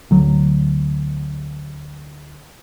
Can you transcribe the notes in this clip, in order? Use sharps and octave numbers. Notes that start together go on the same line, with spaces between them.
D2 F#3